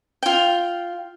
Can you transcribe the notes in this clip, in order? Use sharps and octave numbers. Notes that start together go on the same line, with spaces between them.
F4 G5